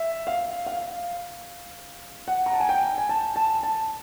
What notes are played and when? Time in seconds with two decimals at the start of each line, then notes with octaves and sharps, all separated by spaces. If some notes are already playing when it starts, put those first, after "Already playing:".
Already playing: E5
0.27 F5
0.66 F5
2.28 F#5
2.46 A#5
2.53 A5
2.60 G#5
2.69 G5
2.98 G#5
3.09 A5
3.36 A5
3.63 A5